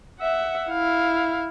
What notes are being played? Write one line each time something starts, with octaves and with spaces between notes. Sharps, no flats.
E5 F#5
E4 F5